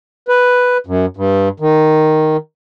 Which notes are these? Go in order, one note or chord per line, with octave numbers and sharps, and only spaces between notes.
B4
F#2
G2
D#3